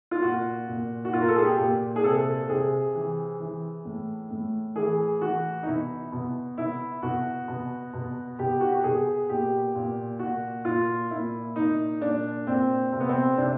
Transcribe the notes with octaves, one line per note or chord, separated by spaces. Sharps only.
F4
A#2 F#4
A#2
F#4
A#2 F4
A#4
A4
G#4
G4
A#2
G#4
C3 A4
C3 G#4
E3
E3
A2
A2
E3 G#4
E3 F#4
D#4
B2 E4
B2
B2 E4
B2 F#4
B2
B2
B2 G4
F#4
G4
B2 G#4
A#2 G4
A#2
A#2 F#4
A#2 F4
A#2 E4
A#2 D#4
A#2 D4
A#2 C4
C3 C4
B3
C4
C3 D4